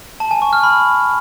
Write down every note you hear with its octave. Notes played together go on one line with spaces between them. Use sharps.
A5
G#5
C#6
F6
B5